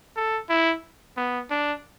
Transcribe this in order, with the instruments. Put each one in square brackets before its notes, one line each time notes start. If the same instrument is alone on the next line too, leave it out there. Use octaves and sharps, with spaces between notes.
[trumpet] A4
E4
B3
D4